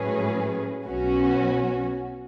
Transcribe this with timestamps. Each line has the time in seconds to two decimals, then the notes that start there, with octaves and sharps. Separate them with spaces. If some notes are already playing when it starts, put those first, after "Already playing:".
Already playing: A2 F#3 C#4 G#4 B4
0.87 B1 B2 F#3 C#4 F#4